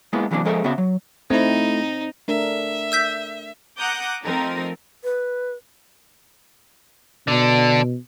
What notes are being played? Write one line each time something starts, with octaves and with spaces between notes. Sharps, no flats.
G#3 A#3 B3 E4
C3 E3 F#3 G3 A#3 D4
F3 G#3 A4 A#4 D#5 E5
C#3 B3 F#4 E5
F#3
A3 C4 D#4 E4
A3 D4 A#4 E5
E6 G6 B6
F#5 A#5 D6 D#6 F#6 G6
F3 A3 C4 D#4 A#4
B4
B2 D3 D4